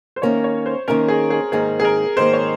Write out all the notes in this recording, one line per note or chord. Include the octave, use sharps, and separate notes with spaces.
C5
D#3 A#3 C#4 C#5
C#5
C5
D#3 A#3 C#4 A#4
G#4
G#4
G#2 D#3 A#3 G#4
G#4
A#4
G#2 D#3 A#3 C5
C#5